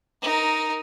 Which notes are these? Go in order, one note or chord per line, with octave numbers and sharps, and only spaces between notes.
D#4 A#4